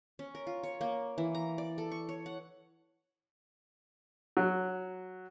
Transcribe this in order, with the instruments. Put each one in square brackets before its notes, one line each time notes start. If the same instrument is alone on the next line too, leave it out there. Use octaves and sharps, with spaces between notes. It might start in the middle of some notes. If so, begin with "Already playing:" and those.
[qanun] C#4
A#4
F4
C#5
A#3
E3
A#5
D5
A4
C#6
C#5
F#5
[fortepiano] F#3